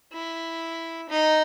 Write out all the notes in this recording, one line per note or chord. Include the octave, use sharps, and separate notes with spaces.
E4
D#4